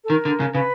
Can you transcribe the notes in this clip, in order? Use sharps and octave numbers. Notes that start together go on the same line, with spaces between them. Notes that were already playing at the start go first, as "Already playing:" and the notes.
A4
D#3 A#4
D3
C#3
C#3 B4